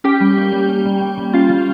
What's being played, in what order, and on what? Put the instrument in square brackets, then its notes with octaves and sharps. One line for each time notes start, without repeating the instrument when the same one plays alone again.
[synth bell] C#4 G4 G5
G3
A#3
G3
C#4
G3
A#3
G3
C#4 F4 F5
G3